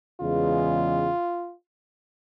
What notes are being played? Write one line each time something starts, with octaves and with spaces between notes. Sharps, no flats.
E2 C#3 E3 G#3 F4